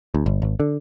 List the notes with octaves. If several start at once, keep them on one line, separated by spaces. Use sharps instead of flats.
D2
G1
G#1
D3